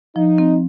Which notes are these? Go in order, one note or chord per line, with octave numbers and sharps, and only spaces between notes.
F3 D#4
C4